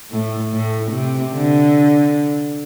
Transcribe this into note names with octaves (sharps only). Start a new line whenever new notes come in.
A2
A2
C3
D3